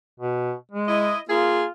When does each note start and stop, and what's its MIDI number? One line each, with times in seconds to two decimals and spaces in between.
0.20 0.53 47
0.72 1.13 56
0.88 1.20 64
0.88 1.20 75
1.29 1.63 58
1.29 1.71 65
1.29 1.63 68